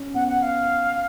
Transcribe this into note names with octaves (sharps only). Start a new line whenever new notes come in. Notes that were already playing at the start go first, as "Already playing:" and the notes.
Already playing: C#4
B3 F#5
F#5
F5